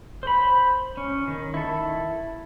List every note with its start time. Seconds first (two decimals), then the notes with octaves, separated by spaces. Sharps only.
0.23 C5 B5
0.97 C#4
1.28 D#3
1.54 E4 A4